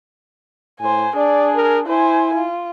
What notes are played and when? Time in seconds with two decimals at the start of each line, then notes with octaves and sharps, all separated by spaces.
0.80 A2 C5 G#5
1.17 D4 G#4 D5
1.56 A#4
1.87 E4 C5 G#5
2.34 F4